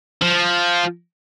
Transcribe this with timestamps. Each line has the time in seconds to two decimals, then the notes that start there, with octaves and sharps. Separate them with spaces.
0.22 F3